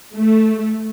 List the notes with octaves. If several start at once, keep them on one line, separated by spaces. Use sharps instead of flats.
A3